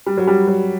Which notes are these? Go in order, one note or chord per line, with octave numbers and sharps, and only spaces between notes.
G3
F#3
G3
F#3